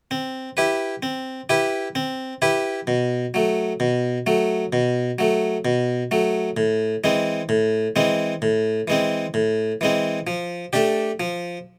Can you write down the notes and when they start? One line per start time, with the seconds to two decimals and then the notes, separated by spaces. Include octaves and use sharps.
0.11 C4
0.57 E4 G4 B4
1.03 C4
1.49 E4 G4 B4
1.95 C4
2.42 E4 G4 B4
2.87 B2
3.34 F#3 A3
3.80 B2
4.27 F#3 A3
4.73 B2
5.19 F#3 A3
5.65 B2
6.11 F#3 A3
6.57 A2
7.04 E3 G#3 C4
7.49 A2
7.96 E3 G#3 C4
8.42 A2
8.88 E3 G#3 C4
9.34 A2
9.81 E3 G#3 C4
10.27 F3
10.73 A3 D4 G4
11.20 F3